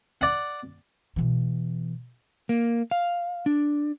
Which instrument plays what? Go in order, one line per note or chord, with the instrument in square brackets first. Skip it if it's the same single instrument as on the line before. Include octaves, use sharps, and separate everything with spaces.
[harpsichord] D5 F#5
[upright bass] B2 E3
[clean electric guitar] A#3
F5
D4